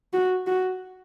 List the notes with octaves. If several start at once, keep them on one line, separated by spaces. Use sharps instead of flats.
F#4
F#4